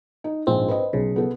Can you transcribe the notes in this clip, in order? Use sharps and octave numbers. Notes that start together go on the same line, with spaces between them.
D#4
A#1 G#2 C4
B4 D#5
B1 C#3
B3 A4